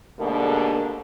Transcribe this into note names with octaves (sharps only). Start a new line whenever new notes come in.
G#2 B2 D3 G3 A3 A#3